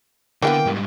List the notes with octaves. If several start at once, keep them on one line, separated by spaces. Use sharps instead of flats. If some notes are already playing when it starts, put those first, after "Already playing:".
D3 E3 G#3 A#3 B3 G5
G#2 G3